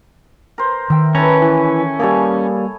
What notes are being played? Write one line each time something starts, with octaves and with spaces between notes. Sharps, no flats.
A#4 C5
D#3 E5 G5
C#4 E4 A4 B4 A#5
E3
G3 A#3 G#4 A4 C#5